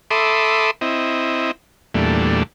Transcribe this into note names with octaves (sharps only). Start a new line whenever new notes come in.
A4 E5 B5 C6 D6 D#6
C4 E4 D#5
E2 A#2 G3 A3 D4